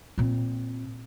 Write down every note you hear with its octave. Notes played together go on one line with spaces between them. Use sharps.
A#2 C4